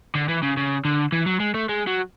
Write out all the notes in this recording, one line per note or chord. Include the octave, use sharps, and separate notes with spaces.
D3
E3
C#3
C#3
D3
E3
F#3
G#3
A3
G#3
F#3